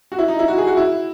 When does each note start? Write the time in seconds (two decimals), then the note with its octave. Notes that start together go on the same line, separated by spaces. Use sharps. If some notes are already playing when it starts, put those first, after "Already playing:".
0.12 F#4
0.18 E4
0.28 D#4
0.39 E4
0.48 F#4
0.58 G#4
0.67 F#4
0.77 E4